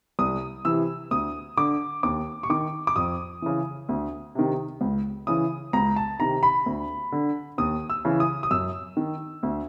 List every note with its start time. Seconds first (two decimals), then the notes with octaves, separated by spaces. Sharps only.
0.19 C2 D#6
0.65 C3 E3 E6
1.11 D2 D#6
1.57 D3 D6
2.03 D#2 D6
2.43 C#6
2.50 D#3 D6
2.87 D6
2.96 F2 D#6
3.42 C#3 E3
3.89 D2
4.35 C3 D#3
4.81 C#2
5.27 C#3 E3 D#6
5.73 C#2 A#5
5.96 A5
6.19 C3 D#3 A#5
6.43 B5
6.66 D2
7.12 D3
7.58 D#2 D#6
7.90 E6
8.05 C#3 E3
8.20 D#6
8.43 D#6
8.51 F#2 E6
8.97 D#3
9.43 D2